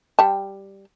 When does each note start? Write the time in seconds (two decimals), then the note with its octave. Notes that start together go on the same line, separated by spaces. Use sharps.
0.19 G3 G5 A5